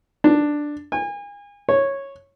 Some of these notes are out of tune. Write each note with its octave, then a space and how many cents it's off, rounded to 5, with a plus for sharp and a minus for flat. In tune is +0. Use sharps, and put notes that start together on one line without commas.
D4 +5
G#5 -35
C#5 -10